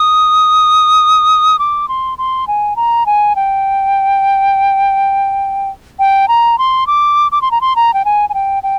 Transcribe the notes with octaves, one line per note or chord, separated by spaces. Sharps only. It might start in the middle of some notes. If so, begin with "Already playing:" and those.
Already playing: D#6
D6
C6
C6
G#5
A#5
G#5
G5
G5
A#5
C6
D6
D6
C6
A#5
C6
A#5
G5
G#5
G#5
G5
G5